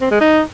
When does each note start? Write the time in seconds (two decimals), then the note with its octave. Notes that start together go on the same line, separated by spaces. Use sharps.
0.01 C4
0.11 G#3
0.21 D#4